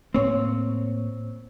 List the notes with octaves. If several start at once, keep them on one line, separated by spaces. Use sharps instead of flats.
A2 A#3 C4 C#5